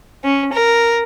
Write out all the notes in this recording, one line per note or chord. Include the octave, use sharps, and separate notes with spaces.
C#4
A#4